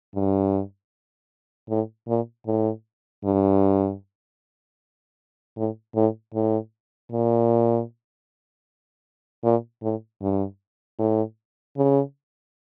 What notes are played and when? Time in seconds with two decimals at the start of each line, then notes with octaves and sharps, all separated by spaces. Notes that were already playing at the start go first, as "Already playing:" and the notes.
0.15 G2
1.69 A2
2.07 A#2
2.46 A2
3.24 G2
5.57 A2
5.95 A2
6.34 A2
7.12 A#2
9.44 A#2
9.82 A2
10.21 G2
10.99 A2
11.77 C#3